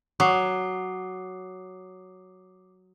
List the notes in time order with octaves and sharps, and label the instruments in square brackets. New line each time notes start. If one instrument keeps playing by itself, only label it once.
[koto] F#3 [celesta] D6 D#6 C7